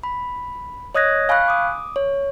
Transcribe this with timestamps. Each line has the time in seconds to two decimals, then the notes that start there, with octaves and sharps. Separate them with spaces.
0.03 B5
0.95 C#5 D#5 D#6 F#6 G#6 A#6
1.29 F5 G#5 B5 C#6 F#6
1.48 D6 D#6
1.96 C#5